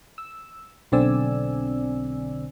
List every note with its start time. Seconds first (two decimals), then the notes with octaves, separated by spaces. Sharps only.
0.18 E6
0.92 B1 D3 C4 D5 G#5 E6